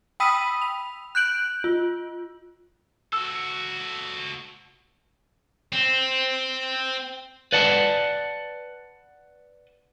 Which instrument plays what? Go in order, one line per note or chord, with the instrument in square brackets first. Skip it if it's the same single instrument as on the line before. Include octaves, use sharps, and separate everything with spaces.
[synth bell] G5 B5 D#6 E6 B6 D#7
F7
F#6 G6 D7 F#7
F4
[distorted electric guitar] F#4 A4 [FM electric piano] E6
[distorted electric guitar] C4
[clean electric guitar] B4 D5 F#5 A5